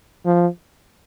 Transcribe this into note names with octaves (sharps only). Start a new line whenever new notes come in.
F3